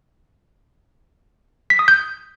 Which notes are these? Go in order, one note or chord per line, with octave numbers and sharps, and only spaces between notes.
B6
D#6
G6